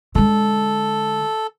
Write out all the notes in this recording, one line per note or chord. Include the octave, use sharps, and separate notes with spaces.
D3 G#3 A4